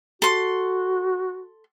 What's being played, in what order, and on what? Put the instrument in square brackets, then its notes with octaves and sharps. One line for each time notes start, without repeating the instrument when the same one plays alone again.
[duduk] F#4 [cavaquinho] A4 C6